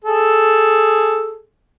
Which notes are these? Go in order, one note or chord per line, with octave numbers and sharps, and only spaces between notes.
G#4 A4